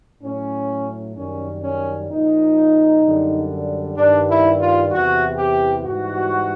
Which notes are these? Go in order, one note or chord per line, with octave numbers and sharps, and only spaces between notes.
A2 F#3 C#4
F#2 D#3 G3 C#4
C#4
A#2 F3 D#4
F#2 D3 G3
G2 D#3 G3 D4
E4
F4
E2 C3 E3 F#4
G4
G#2 E3 G3 F#4